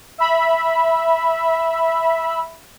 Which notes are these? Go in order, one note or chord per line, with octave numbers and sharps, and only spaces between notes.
E5 B5